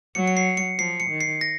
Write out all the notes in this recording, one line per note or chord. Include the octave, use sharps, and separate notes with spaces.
F#3 C#7
C#7
C7
C#7
F3 C7
C#7
D#3
C7
A#6